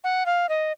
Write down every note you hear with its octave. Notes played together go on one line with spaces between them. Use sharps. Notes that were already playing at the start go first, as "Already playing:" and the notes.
F#5
F5
D#5